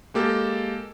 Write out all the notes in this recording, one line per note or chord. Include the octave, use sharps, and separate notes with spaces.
G#3 A#3 G4 A4